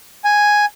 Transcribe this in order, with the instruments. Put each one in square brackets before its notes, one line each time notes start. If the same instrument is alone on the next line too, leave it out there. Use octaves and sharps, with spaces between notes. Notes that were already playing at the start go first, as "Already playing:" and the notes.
[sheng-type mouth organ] G#5